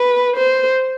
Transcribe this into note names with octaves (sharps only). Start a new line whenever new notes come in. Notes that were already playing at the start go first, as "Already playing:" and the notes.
Already playing: B4
C5